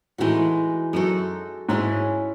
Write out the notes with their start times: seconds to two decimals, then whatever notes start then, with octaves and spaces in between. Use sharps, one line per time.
0.18 A2 E3 G#3 D#4 F#4
0.93 F#2 G#3 D#4 F#4 A4
1.69 G#2 G#3 C#4 E4 G#4